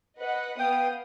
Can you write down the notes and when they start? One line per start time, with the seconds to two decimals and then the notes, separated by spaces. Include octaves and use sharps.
0.20 B4 D#5 F#5
0.59 B3 F5 G5 D#6